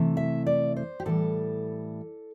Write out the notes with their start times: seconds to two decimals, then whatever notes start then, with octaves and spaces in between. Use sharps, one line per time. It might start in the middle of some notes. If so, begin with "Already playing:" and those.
Already playing: C3 E3 A3
0.17 E5
0.46 D5
0.76 C5
1.00 G4
1.05 A2 E3 G3 A4